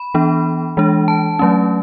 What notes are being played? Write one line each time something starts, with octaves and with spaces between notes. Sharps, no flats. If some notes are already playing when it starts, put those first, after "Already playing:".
Already playing: B5
E3 B3 D4
E3 G#3 D4
A5
F#3 A3 C#4